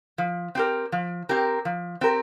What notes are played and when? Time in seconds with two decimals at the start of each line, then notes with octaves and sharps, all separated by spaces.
0.18 F3
0.55 C4 G4 A#4
0.92 F3
1.29 C4 G4 A#4
1.65 F3
2.01 C4 G4 A#4